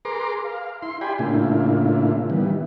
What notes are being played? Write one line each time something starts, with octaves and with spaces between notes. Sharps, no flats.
G#4 A#4 B4 A#5 C6 D6
F5
E4 C6
G4 D5 G5 G#5 B5
A2 C#3 A#3 D4 E4 F4
D#3 E3 G3 B3